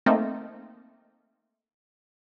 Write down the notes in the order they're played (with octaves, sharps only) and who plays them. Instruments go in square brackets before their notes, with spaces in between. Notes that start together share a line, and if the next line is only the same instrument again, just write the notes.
[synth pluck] A3 A#3 C4 D#4